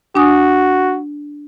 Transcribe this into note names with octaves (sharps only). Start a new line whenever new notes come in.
D4 F#4 G#5 D#6